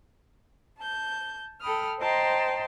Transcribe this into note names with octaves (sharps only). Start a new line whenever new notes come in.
A5 G6
A4 G5 B5 D#6 F6
C5 D#5 G5 A5 A#5 C6